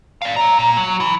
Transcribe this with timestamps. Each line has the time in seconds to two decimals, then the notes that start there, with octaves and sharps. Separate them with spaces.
0.22 D5 F5
0.36 C#5 A#5
0.59 A#2
0.77 F#3
1.00 E3